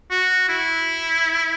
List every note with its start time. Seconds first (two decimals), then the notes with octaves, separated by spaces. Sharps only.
0.11 F#4
0.49 E4